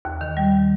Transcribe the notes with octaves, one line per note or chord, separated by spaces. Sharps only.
D#2
D#3
G3